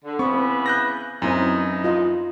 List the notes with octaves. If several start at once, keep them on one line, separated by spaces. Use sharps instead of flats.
D3
C#3 E3 B3 C4 C#6
F#6 G6 A#6
F#2 E3 C4 D#4 E4 G#5
F4 D#5